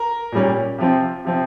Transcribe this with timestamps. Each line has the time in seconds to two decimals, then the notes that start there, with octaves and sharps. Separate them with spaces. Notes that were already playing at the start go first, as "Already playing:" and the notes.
Already playing: A#4
0.32 A#2 G3 C#4
0.78 C3 F3 C4
1.25 C3 F3 C4